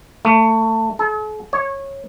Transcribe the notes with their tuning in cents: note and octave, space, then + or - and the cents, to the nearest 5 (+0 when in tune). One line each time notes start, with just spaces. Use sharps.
A3 +20
A4 -45
C#5 -15